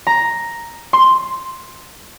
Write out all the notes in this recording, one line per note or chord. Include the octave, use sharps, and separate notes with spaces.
A#5
C6